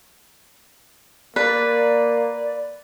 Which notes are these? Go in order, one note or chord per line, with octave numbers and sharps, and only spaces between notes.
A#3 B4 D5